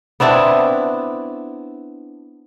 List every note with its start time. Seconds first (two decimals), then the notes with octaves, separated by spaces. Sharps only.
0.20 B3 C4 D4 E4